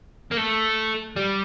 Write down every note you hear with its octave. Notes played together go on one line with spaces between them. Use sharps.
A#3
A3
G3